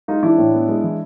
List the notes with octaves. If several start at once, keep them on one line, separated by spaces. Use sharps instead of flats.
G#3 D#4 F4
E3 D4 E4
A2
B3
G#3
E3